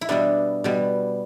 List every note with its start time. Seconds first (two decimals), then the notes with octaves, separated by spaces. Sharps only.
0.01 E4
0.09 B2 G3 B3 D4
0.64 B2 G3 B3